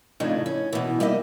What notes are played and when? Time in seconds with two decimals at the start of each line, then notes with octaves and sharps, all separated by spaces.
0.20 F2 A2 C#3 D4 D#4
0.46 C#4
0.73 B2 E3
1.00 G3 A#3 D#4 G4 D#5 E5